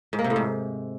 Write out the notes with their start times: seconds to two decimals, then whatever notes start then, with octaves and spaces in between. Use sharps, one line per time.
0.13 G#2
0.19 A#3
0.24 C3
0.30 A2
0.36 G#2